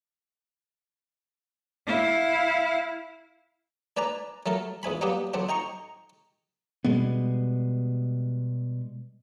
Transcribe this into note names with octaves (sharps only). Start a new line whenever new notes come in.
E4 F5
D4 B4 D5 G#5 A#5
F#3 A3 A4 A#4
E2 G#2 G#5 B5
F#3 G3 A#3 B3 D4 G4
D3 F#3 C4 D4
D#4 G5 A#5 C#6
B2 G3 G#3 B3